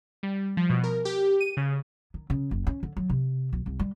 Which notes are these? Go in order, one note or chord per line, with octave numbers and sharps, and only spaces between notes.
G3
F3
B2
A#4
G4
D#7
C#3
D#3
C#3
F#1
C#4
D3
F#3
C3
B1
C2
G3